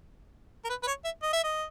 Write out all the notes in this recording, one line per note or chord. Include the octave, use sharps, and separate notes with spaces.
A#4
B4
B4
C#5
E5
D#5
E5
D#5